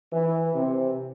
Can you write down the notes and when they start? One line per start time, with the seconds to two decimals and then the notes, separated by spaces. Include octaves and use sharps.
0.13 E3
0.55 C3